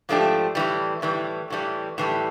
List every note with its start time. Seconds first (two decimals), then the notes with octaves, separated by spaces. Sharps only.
0.09 G#2 F3 A3 D4 G4
0.55 A2 E3 G3
1.02 A2 E3 G3
1.50 A2 E3 G3
1.98 A2 E3 G3